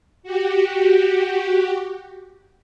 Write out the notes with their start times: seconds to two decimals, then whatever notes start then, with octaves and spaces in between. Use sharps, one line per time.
0.23 F#4 G4